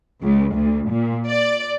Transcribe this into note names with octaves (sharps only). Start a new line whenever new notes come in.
C#2
D2
A#2
D5